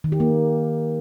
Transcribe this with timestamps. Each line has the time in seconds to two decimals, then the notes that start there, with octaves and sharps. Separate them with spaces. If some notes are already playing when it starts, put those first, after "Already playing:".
0.04 D#3
0.12 G4
0.20 A#3